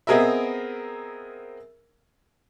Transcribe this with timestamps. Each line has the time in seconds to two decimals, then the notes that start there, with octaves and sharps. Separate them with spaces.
0.07 B3 C4 G#4 A#4 D#5 E5